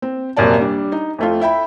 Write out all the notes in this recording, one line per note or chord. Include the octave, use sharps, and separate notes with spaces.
C4
D#1 F#2 C3 A#3 D5 A5
G3 D4
D#4
F2 A3 F4
E4 E5 G5 B5